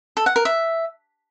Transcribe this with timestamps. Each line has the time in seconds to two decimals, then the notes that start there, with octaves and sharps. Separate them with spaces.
0.17 A4
0.26 F#5
0.36 A#4
0.45 E5